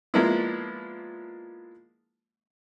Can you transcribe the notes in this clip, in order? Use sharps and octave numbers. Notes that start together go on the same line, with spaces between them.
F3 G#3 A#3 B3 D4 E4